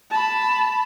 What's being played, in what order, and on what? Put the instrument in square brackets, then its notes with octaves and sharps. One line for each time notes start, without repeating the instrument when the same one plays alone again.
[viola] A5 B5